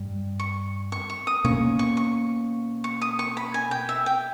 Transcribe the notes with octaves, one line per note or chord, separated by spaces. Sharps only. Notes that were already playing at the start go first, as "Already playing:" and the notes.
Already playing: G2 G3
C#6
C#6
C#6
D#6
B2 A#3 C#4 C#6
C#6
C#6
C#6
D#6
C#6
B5
G#5
G5
E5
G5